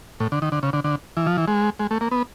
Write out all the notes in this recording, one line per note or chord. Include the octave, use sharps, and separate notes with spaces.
A2
D3
D#3
D3
C#3
D3
D3
E3
F3
E3
G#3
G#3
A3
A#3
B3